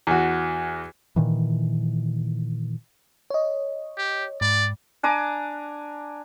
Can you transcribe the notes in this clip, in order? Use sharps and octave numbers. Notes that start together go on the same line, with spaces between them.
E2 F#4
A#2 D#3 E3
C#5 D#5
G4
G#2 D5
D4 G#5 A#5 D6